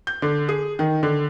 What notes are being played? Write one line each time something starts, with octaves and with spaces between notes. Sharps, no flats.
G6
D3
G#4
D#3
D3